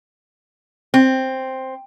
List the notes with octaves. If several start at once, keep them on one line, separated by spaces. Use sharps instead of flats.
C4